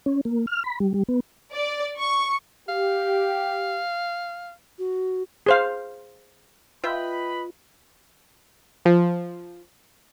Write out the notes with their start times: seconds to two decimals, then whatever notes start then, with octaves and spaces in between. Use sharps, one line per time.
0.06 C#4
0.25 A#3
0.47 F6
0.64 B5
0.80 G3
0.94 G3
1.08 B3
1.52 D5
1.98 C#6
2.68 G4 F5
4.79 F#4
5.46 G#4 C5 F5
6.84 F4 B4 D#5 E5 G5 B5
8.85 F3